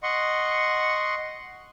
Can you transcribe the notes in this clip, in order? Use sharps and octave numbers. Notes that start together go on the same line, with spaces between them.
D#5 F#5 C6 C#6